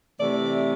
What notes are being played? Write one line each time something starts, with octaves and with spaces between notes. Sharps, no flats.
C3 E3 A3 D5